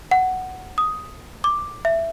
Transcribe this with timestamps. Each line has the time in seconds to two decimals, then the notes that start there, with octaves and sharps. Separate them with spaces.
0.11 F#5
0.78 D#6
1.44 D6
1.85 E5